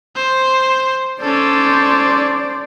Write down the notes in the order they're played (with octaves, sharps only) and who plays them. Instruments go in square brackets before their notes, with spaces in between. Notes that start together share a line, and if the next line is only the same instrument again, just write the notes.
[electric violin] C5
[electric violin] C#4 A4 [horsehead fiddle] C5 D5